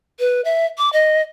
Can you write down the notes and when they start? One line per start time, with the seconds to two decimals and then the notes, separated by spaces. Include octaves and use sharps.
0.20 B4
0.45 E5
0.78 D6
0.93 D#5